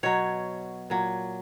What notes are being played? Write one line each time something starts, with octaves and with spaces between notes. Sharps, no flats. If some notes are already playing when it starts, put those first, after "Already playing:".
B2 F#3 C#5
A#2 F#3